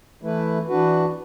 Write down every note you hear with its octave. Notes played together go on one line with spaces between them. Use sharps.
E3 A3 E4 B4
E3 D4 F#4 B4